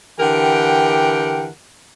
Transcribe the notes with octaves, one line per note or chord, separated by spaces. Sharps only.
D3 E3 G4 A#4 F#5 G5